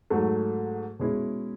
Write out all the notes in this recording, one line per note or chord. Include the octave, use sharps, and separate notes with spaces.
G#2 F#3 A3
B2 G#3 C#4 E4